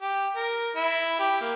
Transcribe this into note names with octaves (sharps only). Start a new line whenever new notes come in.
G4
A#4
E4
G4
A#3